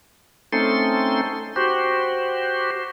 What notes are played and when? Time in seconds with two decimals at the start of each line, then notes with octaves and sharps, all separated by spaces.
0.53 A3 C4 C#4 D#4 A4 C6
1.56 F#4 G4 C5